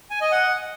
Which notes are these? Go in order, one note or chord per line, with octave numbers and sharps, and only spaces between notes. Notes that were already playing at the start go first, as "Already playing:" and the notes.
G#5
D#5
F#5